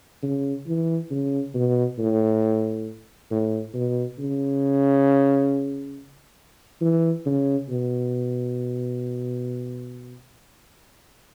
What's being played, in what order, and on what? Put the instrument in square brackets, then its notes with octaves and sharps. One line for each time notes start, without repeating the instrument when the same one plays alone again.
[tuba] C#3
E3
C#3
B2
A2
A2
B2
C#3
E3
C#3
B2